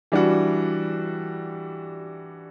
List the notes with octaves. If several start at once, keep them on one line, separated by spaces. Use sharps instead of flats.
E3 G3 D4 F#4